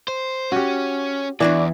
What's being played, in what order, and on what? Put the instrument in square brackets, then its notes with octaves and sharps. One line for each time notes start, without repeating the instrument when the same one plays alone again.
[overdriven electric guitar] C5
[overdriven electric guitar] C#4 [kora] F#4 G4
[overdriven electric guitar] E2 [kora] E3 [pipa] D4 F#4 D5